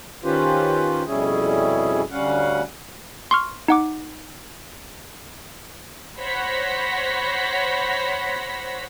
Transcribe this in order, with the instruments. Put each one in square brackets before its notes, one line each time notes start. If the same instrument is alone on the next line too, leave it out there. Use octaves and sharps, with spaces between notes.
[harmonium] D#3 C#4 F4 G4 B4 C5
F2 B2 G3 C#4 E4 G#4
D2 G3 C#4 F5 F#5
[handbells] C6 C#6 F6
D#4 F#5 D6
[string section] C5 C#5 F#5 B5 A#6 B6